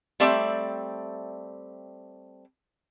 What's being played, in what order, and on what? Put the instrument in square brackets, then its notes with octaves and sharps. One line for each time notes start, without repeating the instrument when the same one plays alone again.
[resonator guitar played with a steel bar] G3 A3 C4 D5 E5